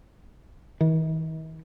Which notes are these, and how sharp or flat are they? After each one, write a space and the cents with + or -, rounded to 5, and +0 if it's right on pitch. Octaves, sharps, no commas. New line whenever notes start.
D#3 +45